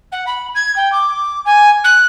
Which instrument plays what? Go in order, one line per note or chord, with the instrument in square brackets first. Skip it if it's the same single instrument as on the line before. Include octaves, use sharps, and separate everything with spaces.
[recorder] F#5
B5
G#6
G5
D6
G#5
F#6